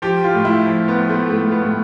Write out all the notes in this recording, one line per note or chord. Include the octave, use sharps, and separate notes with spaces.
F3 G4
F4
A2
E4
F3
B3
F3
A3
A2 A3
B3
A2